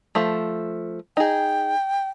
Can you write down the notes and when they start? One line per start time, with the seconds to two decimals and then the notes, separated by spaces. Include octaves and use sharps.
0.15 F3 A3
1.17 D#4 G#4 G5